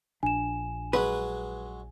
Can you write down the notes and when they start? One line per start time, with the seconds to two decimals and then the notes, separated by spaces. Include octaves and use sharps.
0.23 A#1 D4 G#5 E7
0.93 F#3 G#3 B4